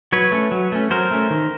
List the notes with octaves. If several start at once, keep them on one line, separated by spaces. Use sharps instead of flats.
F#3 B4 C#5
A3 C#4
F#3
A3 C#4
F#3 A#4 C5
A3 C#4
D#3